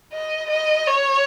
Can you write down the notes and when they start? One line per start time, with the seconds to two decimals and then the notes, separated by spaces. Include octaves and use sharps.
0.14 D#5
0.50 D#5
0.88 C#5